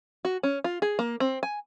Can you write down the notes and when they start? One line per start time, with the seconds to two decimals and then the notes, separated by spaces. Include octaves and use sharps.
0.25 F#4
0.43 C#4
0.64 F4
0.82 G#4
0.99 A#3
1.20 C4
1.43 G#5